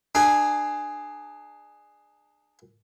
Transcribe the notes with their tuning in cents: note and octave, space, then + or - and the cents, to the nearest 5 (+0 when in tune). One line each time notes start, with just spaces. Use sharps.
D4 +30 G#4 +0